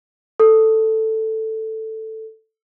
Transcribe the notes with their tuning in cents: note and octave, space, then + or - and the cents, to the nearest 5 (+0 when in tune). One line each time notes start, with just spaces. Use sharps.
A4 +5